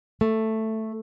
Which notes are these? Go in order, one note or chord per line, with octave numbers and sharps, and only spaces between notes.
A3